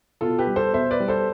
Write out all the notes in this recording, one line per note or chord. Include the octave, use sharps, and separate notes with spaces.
B2 F4 A4
G4 B4
G3
A4 C5
B2 C5 E5
B4 D5
G3
A4 C5